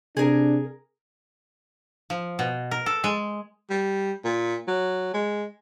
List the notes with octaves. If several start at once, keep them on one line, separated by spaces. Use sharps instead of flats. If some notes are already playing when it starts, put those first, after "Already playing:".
C3 D4 G#4 A#4
F3
B2
A#4
A4
G#3
G3
A#2
F#3
G#3